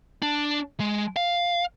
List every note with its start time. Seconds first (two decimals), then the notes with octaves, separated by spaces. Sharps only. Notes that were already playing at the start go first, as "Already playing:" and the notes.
0.22 D4
0.80 G#3
1.16 F5